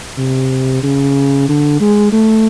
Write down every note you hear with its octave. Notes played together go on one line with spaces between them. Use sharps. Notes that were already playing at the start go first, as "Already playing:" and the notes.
C3
C#3
D3
G#3
A3